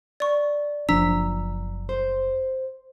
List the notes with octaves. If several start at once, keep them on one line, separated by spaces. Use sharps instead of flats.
D5 C#6
F#1 F3 D4 A#5 E6 B6
C5